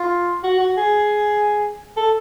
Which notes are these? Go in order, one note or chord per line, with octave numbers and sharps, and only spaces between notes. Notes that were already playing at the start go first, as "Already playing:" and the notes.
Already playing: F4
F#4
F#4
G#4
A4